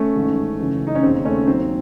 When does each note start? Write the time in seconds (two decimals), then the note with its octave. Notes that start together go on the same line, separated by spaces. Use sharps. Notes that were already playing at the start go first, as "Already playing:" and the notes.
Already playing: A3 C#4
0.15 A1 G#2 D#3
0.58 F#1 F#2 E3
0.87 D#4
0.95 C#4
1.03 E1 D#2 C#3 C4
1.25 A3 C#4
1.47 D#2 D#3 F#3 C4